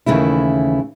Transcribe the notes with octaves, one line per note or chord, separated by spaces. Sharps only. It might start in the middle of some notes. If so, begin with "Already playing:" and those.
D#2 C#3 E3 A3 E4